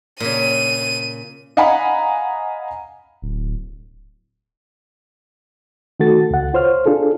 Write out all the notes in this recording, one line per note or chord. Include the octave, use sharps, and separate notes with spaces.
A#2 C#3 D#7
D#5 F5 F#5 G#5 A#5 B5
D1
D#3 A3 F#4 A4 A6
C#2 F#5
F4 C5 C#5 F6
D4 F4 G#4 A4